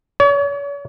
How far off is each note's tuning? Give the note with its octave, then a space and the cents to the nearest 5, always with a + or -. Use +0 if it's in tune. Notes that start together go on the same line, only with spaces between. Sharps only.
C#5 +40